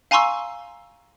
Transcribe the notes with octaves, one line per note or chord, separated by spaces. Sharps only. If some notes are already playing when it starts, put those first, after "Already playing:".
F5 G#5 A#5 C6 C#6 E6